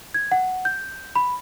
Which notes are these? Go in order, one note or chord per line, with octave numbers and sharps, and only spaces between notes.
G#6
F#5
G6
B5